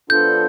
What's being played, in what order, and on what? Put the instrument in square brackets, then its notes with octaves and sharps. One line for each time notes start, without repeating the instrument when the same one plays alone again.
[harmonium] F3 B3 D4 F4 A4 [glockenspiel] G6